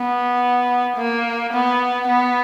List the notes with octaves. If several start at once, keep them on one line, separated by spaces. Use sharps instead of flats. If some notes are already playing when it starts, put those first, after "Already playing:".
Already playing: B3
A#3
B3
B3